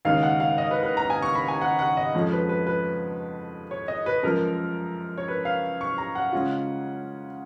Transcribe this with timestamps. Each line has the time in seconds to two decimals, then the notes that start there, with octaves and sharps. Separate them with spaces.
0.05 D#2 C#3 G#3 D#4 F5
0.23 F#5
0.40 F5
0.58 D#5
0.71 B4
0.83 B4
0.97 A#5
1.10 G#5
1.22 C#6
1.35 B5
1.48 G#5
1.61 F#5
1.79 F#5
1.97 D#5
2.15 F2 F3 G#3 C#4
2.32 B4
2.49 B4
2.67 B4
3.71 C#5
3.88 D#5
4.06 B4
4.23 F#2 F3 G#3 A#4
5.18 C#5
5.28 B4
5.45 F5
5.81 C#6
5.98 A#5
6.15 F#5
6.32 C#3 G#3 C#4 F4